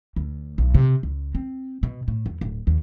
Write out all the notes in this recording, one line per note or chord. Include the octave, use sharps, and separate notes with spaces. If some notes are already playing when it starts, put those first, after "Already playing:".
D2
B1
C3
C#2
C4
B2
A2
E2
D1
D#2